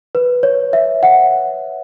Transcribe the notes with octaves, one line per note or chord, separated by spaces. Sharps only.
B4
C#5
E5
F#5